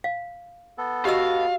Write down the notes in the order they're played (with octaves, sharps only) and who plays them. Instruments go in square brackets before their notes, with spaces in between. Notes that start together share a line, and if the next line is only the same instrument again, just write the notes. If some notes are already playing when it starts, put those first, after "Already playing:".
[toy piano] F5
[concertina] B3 A4
[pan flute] F#4 [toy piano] G4 D#5 E6 [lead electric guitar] F5